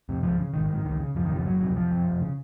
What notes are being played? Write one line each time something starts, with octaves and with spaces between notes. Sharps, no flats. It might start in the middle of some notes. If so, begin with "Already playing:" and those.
F2 C3
C#2 F3
C#3
G#1 D#3
D#3
G#2
D#3
C#2 D#3
C#3
F#1 F3
D#3
F2 C#3 F3
F#1 F#3
F2 C3 F#3
F1 F3
F2 C3
F1
C#3